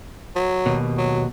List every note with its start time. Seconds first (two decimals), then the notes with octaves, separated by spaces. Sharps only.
0.36 F#3
0.66 D#2 B2
0.98 F#3